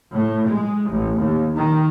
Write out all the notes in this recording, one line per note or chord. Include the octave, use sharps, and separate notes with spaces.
A2
G#3
A1
D#2
D#3